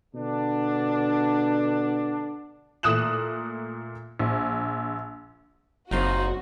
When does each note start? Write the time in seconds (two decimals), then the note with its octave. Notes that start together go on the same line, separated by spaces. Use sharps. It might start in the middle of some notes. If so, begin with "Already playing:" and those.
0.15 B2 D3 D4
2.83 A#2 A3 D#6 F#6 E7 F#7
4.19 A#1
5.91 F#1 F#2 C#3 C4 D#4 F4 F#4